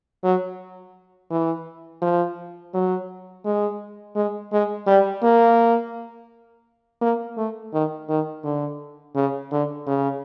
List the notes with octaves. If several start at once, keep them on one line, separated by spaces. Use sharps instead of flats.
F#3
E3
F3
F#3
G#3
G#3
G#3
G3
A#3
A#3
A3
D#3
D#3
D3
C#3
D3
C#3